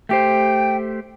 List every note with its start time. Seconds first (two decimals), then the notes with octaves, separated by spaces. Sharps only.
0.09 A3 G4 C5 G5